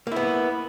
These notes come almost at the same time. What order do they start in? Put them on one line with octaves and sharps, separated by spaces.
A#3 E4 B3